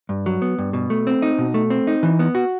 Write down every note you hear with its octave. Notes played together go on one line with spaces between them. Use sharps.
G2
F#3
B3
G2
B2
A3
C4
D#4
B2
A3
C4
D#4
E3
B3
F#4